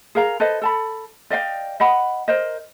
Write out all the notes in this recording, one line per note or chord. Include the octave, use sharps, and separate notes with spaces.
G#4 A#4 F5 A#5
A4 B4 C5 D#5
A4 A5 B5
D5 D#5 F5 G5
D#5 F#5 B5
A#4 C5 D#5